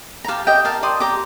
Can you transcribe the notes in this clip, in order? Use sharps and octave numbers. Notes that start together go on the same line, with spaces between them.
A#5
G4 F5 A5
G4 D#5 G5
A#4 F5 A5
D5 C6 D#6
G4 A#5 D6